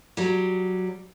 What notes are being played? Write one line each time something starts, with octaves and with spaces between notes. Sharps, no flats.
F#3 G3